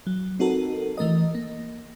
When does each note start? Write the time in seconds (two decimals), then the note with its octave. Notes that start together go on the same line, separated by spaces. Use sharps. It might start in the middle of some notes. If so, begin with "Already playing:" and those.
0.07 F#3
0.39 C4 D#4 F#4 A4 A#4
0.97 E3 A3 A#4 D#5
1.35 A#3